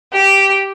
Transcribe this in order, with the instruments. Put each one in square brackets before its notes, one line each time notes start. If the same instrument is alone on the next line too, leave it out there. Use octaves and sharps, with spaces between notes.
[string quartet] G4